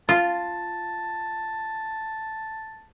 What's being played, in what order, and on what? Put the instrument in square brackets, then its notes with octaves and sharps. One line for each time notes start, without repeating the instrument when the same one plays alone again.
[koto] F4 [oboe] A5